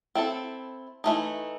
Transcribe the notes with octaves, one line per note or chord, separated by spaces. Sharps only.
C4 E4 A4
E3 A3 D#4